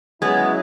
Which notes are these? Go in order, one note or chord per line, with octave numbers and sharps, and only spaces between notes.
F#3 G#3 B3 C#4 E4 G#4